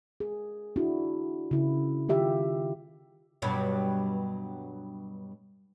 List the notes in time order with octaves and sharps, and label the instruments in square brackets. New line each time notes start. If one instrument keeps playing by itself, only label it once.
[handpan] G#4
D4 E4 F#4
C#3 E4
D#3 F4 G4 E5
[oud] G2 B2 F#3